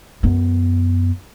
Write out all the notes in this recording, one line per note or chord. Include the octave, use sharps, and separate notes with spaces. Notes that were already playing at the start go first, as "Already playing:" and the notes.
F#2 B3